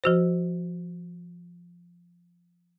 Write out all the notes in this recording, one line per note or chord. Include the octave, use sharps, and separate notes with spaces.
F3 F#4 C5